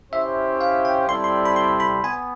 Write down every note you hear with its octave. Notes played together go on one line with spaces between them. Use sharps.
C#4 E4 G4 C5 E5
F5
G5
G3 C4 E4 A4 D5 C6
C6
B5
C6
B5
B3 G#5